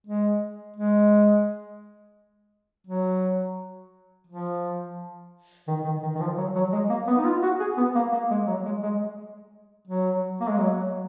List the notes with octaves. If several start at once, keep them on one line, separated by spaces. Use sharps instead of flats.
G#3
G#3
F#3
F3
D#3
D#3
D#3
D#3
F3
F#3
F#3
G#3
A#3
B3
D#4
F4
F#4
G#4
B3
A#3
A#3
G#3
F#3
G#3
G#3
F#3
A#3
G#3
F#3